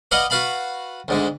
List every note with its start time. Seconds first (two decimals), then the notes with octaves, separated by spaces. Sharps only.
0.11 B4 D5 D#5 F5 F#5 A5
0.30 F#4 B4 F5 A5 B5
1.08 D2 G#2 D3